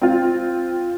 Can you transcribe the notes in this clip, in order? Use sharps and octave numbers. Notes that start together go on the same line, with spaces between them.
C4 F4